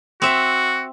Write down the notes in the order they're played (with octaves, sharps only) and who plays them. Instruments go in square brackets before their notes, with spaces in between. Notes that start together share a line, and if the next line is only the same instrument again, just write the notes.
[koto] C4 E5 [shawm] F#4